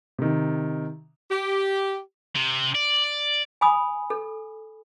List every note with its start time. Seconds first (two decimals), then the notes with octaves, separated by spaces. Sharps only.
0.19 C3 D#3
1.30 G4
2.36 C3
2.75 D5
3.61 G#5 B5 D#6
4.10 A4